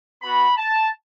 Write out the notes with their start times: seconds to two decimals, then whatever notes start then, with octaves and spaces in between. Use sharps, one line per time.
0.22 B3 F#4 B5
0.56 A5